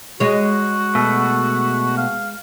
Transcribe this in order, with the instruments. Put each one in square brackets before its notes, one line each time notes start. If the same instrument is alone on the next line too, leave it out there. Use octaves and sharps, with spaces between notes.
[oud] G#3 C#5 [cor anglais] F#4
[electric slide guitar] B2 A3
[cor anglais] F5